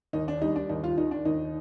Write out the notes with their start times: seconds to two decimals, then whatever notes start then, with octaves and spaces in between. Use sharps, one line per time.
0.13 D#2 D#4
0.28 D4
0.41 G3 D#4
0.56 D4
0.69 D#2 D#4
0.84 F4
0.97 D#3 D#4
1.11 D4
1.25 D#2 D#4